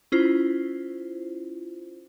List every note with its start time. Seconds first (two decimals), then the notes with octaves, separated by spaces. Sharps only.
0.12 C#4 E4 F4 C5